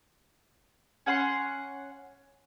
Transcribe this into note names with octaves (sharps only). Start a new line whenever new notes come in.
C#4 F#5 G#5 C6